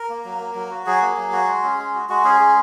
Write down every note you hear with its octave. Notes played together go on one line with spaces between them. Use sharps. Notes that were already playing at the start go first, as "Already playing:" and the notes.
Already playing: A#4
A#3
F#3
A#3
F#3
F#4
F#3 G#4
A#3
F#3
F#4
G#3
C#4
G#3
F#4
G#3 F#4
C#4 G#4
G#3 G#4